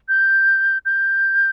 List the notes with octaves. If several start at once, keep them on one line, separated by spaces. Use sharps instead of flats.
G6
G6